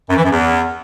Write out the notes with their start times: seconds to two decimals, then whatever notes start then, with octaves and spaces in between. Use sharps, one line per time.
0.09 F#2
0.17 E3
0.24 F#2
0.31 E2